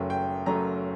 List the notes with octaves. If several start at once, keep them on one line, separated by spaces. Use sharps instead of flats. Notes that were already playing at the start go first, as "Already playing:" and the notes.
Already playing: F#1 F#2 F#3 A3 G5
G5
F#1 F#2 F#3 A3 A#5